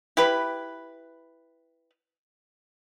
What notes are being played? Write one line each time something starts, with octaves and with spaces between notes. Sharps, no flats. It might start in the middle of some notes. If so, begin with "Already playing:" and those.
E4 G4 B4